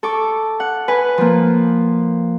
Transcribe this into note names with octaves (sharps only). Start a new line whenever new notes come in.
A4 C#6 D6
F#5
B4 G#5
F3 A#3